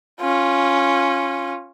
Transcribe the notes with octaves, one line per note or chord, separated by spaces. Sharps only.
C#4 F4